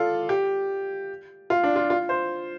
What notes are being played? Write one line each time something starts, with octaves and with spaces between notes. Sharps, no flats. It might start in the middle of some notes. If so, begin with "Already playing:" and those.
Already playing: F4 A4 D5
G4
F4
D4
F4
F4
C5